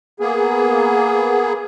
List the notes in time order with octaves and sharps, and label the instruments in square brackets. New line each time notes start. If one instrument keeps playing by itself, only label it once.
[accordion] A#3 B3 G#4